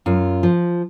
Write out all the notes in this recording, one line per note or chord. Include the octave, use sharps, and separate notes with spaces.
F#2 F4
F3